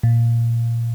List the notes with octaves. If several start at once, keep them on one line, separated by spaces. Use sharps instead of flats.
A#2